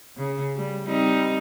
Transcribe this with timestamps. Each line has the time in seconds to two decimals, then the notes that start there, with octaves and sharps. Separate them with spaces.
0.17 C#3
0.57 G3
0.87 G3 C4 D#4